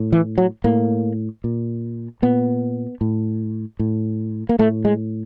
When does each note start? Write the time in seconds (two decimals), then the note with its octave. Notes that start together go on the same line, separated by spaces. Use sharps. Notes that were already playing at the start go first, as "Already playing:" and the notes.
Already playing: A2
0.12 E3
0.38 F#3
0.64 A2 A#3
1.44 A#2
2.22 A#2 B3
3.01 A2
3.79 A2
4.49 A#3
4.59 A2 A3
4.85 G#3